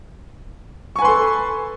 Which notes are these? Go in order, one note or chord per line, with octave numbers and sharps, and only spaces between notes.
A4 B4 G#5 C6 C#6